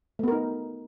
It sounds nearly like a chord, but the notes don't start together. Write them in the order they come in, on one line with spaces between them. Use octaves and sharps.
A3 B3 A#4 D#4